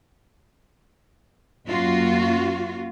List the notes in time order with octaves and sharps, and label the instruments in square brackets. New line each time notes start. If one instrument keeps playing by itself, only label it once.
[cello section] F#2 A#3 F4 F#4